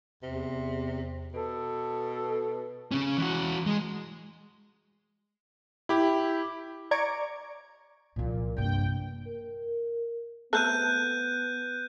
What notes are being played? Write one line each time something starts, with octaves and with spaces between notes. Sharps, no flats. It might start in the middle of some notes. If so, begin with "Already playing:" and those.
E2 C3
B2 A4
C#3 C#4
E3 F#4
G#3
E4 G4
D5 A#5 C#6 D6 G#6 D7
C2 A#2 F3
A#1 G2 C3 A#3 G5
A#4
A3 B3 C4 A4 F#6 G6 D#7